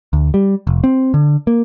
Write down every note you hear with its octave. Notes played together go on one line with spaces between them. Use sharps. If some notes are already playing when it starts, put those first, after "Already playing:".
D2
G3
F1
C4
D3
A#3